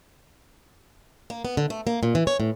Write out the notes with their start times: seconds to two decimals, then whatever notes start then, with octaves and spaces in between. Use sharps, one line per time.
1.30 A#3
1.45 B3
1.57 D3
1.70 A3
1.87 A#3
2.03 A#2
2.15 E3
2.27 C#5
2.40 A2